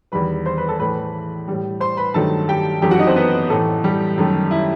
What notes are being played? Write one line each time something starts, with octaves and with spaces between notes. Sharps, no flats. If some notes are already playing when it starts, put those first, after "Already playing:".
E2 D#3 G3 B4 B5
C5 C6
B4 B5
A4 A5
A2 E3 A3 B4 B5
A2 G3
C5 C6
B4 B5
G2 D#3 F#3 A3 A4 A5
G4 G5
F#2 E3 A3 G4 G5
F#4 F#5
D#4 D#5
C4 C5
B3 B4
A2 E3 A3 A4
G3 G4
F#2 D#3 A3
E4